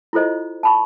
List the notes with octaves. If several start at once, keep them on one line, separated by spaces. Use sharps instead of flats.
E4 F4 A4 C5 D#5
A5 B5 C#6